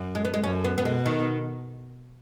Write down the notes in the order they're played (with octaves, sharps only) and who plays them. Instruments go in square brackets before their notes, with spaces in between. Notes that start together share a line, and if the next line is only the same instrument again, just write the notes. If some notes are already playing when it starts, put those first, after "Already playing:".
Already playing: [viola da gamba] F#2
[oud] G#3
B3
G#3
[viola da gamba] F#2 [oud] C#4
[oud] B3
B3
[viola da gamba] B2 [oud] G#3
[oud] D#3